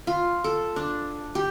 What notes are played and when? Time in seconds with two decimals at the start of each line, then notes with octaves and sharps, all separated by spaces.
0.07 F4
0.44 A4
0.76 D4
1.35 G4